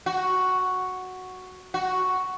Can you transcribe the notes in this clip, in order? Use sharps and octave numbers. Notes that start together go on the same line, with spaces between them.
F#4
F#4